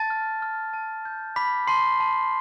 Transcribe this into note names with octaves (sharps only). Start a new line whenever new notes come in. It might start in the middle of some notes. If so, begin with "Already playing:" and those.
Already playing: A5 A6
F6
F6
A5
G6
B5 D6 B6
A5 C6 C7
A5